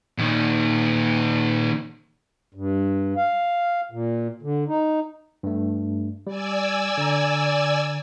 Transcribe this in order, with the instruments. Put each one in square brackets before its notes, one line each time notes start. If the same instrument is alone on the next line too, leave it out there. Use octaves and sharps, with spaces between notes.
[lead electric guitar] A#2 D#3
[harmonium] G2
F5
A#2
D3
D#4
[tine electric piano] G2 A3
[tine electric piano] G3 [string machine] D5 G#5 E6
[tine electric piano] D3 A#5